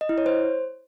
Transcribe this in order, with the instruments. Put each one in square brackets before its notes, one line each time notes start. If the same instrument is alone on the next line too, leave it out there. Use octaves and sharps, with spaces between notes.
[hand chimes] D#5
E4
C#5
C5